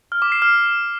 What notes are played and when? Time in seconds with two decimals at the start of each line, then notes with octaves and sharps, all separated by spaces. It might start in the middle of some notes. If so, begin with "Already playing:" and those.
0.12 F6
0.22 D6
0.32 C7
0.42 F6